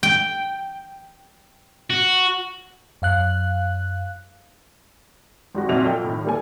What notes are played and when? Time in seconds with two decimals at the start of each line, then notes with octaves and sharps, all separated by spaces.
0.03 G5
1.90 F#4
3.02 F#2 F5 F#6
5.54 G#1 G3 F#4
5.69 F2 A#2 F#4 E5 F6 F7
5.85 F3 A4 G5
6.04 A2 D#3
6.25 G3 A#3 A4 G#5